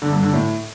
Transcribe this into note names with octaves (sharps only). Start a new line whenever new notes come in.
D3
G2
D3
A2